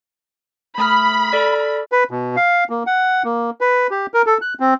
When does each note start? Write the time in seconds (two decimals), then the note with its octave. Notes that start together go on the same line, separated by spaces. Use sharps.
0.78 A3 B5 D#6 F6
1.32 A4 D5 F6
1.92 B4
2.11 B2
2.37 F5
2.70 A#3
2.87 F#5
3.24 A#3
3.61 B4
3.91 G4
4.14 A#4
4.26 A4
4.42 F#6
4.60 C4